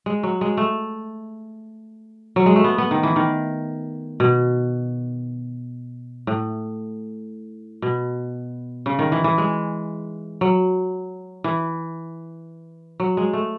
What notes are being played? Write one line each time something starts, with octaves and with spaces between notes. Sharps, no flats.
G#3
F#3
G#3
A3
F#3
G#3
A3
B3
B3
D#3
E3
D#3
B2
A2
B2
C#3
D#3
E3
E3
G#3
F#3
E3
F#3
G#3
A3